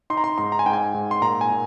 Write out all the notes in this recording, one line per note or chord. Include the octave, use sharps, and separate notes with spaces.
D#4 C6
A#5
C6
G#2 C6
A#5
G#5
G#2 G5
G#5
G#2
C6
A#2 A#5
G#5
A#2